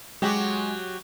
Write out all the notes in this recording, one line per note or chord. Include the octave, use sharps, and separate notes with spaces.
F#3 G#3 F#4 G4